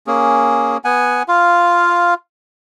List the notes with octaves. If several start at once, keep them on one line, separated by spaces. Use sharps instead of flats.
A#3 C#4 G#4
B3 F#5 G#5
F4 F5